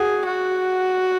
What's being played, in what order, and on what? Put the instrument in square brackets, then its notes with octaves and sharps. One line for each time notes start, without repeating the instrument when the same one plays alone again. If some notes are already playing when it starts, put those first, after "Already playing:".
Already playing: [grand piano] F#4 [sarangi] G#4
[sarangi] F#4